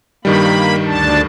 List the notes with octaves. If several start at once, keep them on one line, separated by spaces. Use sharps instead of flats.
G2 D#3 G3 A#3 B5
D2 D4 A5